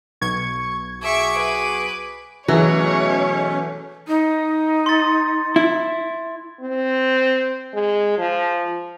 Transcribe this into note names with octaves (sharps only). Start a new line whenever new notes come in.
B1 C#6 G#6
F#4 G#4 E5 C#6 D6 D7
B4
B2 E3 F#3 A3 C#4 G#4 C#5
D#4
C6 A6
E4
C4
G#3
F3